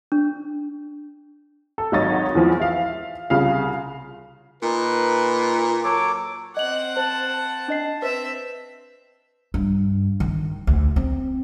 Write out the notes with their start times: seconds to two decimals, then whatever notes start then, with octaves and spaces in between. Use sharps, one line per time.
0.12 D4
1.78 A4
1.92 G#1 F#3 D#4 C#5 A6
2.35 E2 E3 F3
2.60 E5 F5
3.30 C2 C#3 F4 F5
4.63 A#2 D#4 B4
5.84 F#3 A4 C#5 D6
6.57 C4 D#5 F#5 F#7
6.97 C5 A5
7.34 A5
7.68 D4 D#5 C7
8.02 C4 B4 C5 E5
9.54 G2
10.20 D#3
10.67 D2
10.96 C4